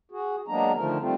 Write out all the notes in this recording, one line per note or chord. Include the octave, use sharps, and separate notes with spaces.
F#4 G#4
F#3 G#3 A#3 B3 D4 A#5
D3 D#3 F3 A3 A#4
D#3 G3 A3 C4 F4